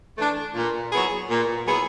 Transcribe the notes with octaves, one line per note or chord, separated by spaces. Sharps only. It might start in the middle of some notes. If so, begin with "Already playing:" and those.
E3 A3 D4
A#2
F#3 B3 E4 G#4
A#2
F#3 B3 E4 G#4